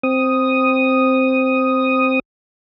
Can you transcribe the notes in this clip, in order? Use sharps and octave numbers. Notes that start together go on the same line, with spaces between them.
C4 D#6